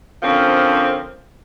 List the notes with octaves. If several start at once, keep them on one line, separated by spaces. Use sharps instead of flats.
D3 F3 A#3 C4 C#4